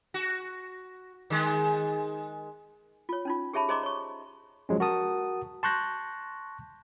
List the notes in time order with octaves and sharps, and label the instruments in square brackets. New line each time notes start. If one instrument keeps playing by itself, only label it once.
[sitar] F#4
D#3 G#3
[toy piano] F4 C#5
C#4 D#4 F4
G4 G#4 C#5 E5 A5 B5
G#4 C5 D#5 A#5 C6 D6
C#5 C#6
[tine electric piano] F3 F#3 G#3 C#4
F#4 A#4 A5 D#6
A5 C6 C#6 F#6 G6 A#6